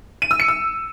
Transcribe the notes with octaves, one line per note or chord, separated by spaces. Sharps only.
D#7
E6
C#7
E6